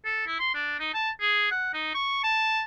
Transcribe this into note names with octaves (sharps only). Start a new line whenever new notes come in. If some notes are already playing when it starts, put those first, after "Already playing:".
A4
E4
C6
D4
D#4
A5
G#4
F#5
D#4
C#6
A5